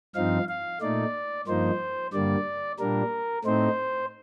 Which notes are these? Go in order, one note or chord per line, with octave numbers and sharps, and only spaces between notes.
G2 F3 C4 D#4 F5
F5
A#2 A3 D#4 D5
G2 F3 A#3 D#4 C5
G2 D3 G3 A#3 D5
A#2 G3 A#3 D4 A#4
A2 A3 C4 D#4 C5